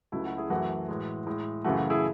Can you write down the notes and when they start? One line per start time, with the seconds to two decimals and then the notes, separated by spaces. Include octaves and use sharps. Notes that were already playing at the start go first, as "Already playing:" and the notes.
0.12 C#2 C#3 F#3 A3 E4
0.25 F#4
0.38 E4 G#4
0.50 F#2 E3 A3 F#4
0.88 A2 E3 G#3
1.26 A2 G#3
1.64 F#2 C#3 E3 A3 F#4
1.77 F#4
1.90 E4 G#4